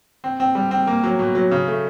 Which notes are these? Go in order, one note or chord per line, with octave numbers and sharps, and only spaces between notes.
C4
C4
G3
C4
A#3
F#3
B2
F#3
C#3
A3